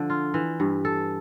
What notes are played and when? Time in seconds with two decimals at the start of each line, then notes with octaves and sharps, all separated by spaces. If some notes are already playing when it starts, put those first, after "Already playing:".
Already playing: D3 F3
0.10 F4
0.34 E3
0.60 G2
0.85 A4